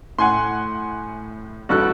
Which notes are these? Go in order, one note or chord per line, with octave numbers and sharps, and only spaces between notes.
A2 F#5 G#5 C6
A1 G2 F#4 A4 F#6